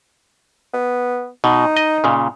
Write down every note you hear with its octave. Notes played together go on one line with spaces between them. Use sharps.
B3
B2 D#4
D#5
A#2 C#3